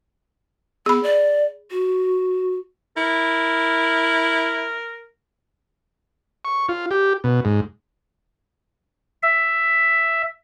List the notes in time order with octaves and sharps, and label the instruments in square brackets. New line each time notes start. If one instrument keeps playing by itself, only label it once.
[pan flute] B3 [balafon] G#4 B5
[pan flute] D5
F#4
[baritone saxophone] E4 [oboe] A#4
[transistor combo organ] C#6
F4
G4
B2
G#2
[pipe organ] E5